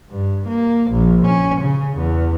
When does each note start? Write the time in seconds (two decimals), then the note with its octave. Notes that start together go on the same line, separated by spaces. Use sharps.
0.10 G2
0.48 A#3
0.91 A#1
1.26 C#4
1.61 C#3
1.97 E2